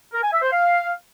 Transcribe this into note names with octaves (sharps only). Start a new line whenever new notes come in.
A#4
G#5
E5
C5
F5